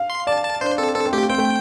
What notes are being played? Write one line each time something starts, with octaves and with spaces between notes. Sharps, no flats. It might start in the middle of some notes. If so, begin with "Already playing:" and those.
Already playing: F5
C6
D5 A5
A5
D4 C5
C4 A4
C4 A4
C4
A3 G4
C4 G5
A3